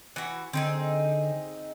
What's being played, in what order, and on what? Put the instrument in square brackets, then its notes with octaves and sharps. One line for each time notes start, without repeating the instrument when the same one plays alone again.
[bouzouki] E3 F#4
[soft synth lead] D3 [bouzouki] C4 D#4 G#4